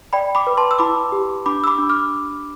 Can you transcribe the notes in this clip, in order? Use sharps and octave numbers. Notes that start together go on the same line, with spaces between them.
D5 G5 B5
B5 D6
B4
A5 C6
E6
E4 B5 D6
G4
D4 B5 D6
E6
B5 D6
D4
D6 F6